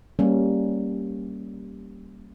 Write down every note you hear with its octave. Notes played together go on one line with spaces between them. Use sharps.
G3 A#3 C#4